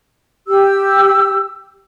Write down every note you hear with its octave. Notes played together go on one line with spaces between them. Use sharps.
G4 E6